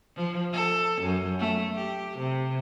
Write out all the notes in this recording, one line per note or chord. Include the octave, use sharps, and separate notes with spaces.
F3
A4
F#2
A3
G4
C3